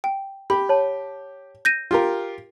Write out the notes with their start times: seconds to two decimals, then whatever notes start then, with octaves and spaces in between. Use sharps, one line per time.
0.04 G5
0.50 G4 B5
0.69 C#5 A5
1.65 G6 A#6 D#7
1.91 F4 G4 A#4